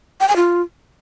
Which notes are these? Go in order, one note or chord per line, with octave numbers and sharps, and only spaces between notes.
G5
G#5
F4